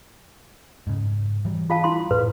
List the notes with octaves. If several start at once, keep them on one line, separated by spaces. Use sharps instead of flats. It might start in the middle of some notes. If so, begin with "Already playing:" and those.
G#2 C#3
E3 F#3 G3
F4 F5 A5
E4 C6
F#2 A2 B4